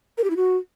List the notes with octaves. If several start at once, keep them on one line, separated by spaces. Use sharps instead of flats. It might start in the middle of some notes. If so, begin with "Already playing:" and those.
A#4
G4
E4
F#4